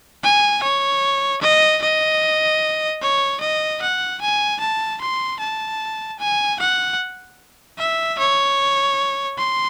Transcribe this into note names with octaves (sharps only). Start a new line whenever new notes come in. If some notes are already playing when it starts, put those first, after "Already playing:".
G#5
C#5
D#5
D#5
C#5
D#5
F#5
G#5
A5
C6
A5
G#5
F#5
E5
C#5
C6